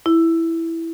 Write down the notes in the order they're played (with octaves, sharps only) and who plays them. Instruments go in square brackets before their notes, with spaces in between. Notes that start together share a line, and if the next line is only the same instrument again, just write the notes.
[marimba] E4